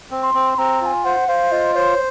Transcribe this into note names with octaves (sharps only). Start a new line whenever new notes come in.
C4
C6
C4
C4 A#5
F4 G#5 A#5
C5 F#5
C5 F5
F4 D#5
C5 C#5